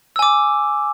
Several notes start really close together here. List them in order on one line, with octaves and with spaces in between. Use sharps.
E6 G#5 D6